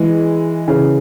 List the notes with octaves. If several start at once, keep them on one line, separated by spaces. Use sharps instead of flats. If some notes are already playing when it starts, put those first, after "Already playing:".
Already playing: E3 G#3
C#3 E3